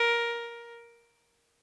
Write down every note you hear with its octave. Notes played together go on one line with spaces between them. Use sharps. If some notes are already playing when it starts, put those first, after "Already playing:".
Already playing: A#4